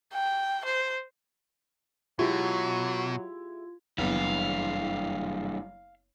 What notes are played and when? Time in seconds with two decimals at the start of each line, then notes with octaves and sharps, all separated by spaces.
0.13 G5
0.65 C5
2.19 B2 F#3 G#3 E4 F4 G4 G#6
3.98 F#1 G3 B3 D4 E4 F5